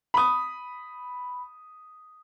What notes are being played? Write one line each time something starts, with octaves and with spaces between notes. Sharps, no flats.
B5 D#6